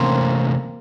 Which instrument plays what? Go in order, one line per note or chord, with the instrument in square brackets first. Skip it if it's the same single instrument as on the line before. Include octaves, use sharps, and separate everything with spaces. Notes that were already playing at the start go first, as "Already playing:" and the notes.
Already playing: [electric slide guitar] C3 E3 A3 C#4 [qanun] A#3 C4